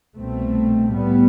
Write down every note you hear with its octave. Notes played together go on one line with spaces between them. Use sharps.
C2 B2 A3 C4
A2 G3 B3